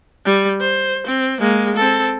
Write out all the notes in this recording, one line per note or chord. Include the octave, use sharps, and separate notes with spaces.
G3
C5
C4
G#3 A#3
C4 A4